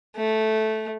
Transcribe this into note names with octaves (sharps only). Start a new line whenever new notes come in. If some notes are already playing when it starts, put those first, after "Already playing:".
A3